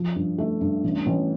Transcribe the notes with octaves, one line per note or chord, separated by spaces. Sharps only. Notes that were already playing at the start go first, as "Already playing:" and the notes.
Already playing: F3
G2
A3
G2
A1
A1